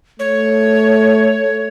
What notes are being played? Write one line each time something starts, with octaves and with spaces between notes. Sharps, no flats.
A3 C#5